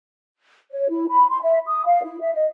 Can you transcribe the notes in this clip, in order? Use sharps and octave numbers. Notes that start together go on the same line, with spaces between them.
C#5
E4
B5
C6
E5
D#6
F5
E4
E5
D#5